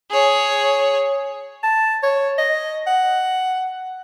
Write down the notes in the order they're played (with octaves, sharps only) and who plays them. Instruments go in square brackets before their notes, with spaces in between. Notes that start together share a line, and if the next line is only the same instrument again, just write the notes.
[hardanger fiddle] G#4 C#5
[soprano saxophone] A5
C#5
D#5
F#5